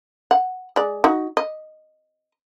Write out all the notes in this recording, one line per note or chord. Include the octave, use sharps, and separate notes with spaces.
F#5
G#3 D5
D#4 F#4
D#5